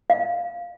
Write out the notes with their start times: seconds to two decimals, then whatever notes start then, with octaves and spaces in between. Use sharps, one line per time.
0.10 F5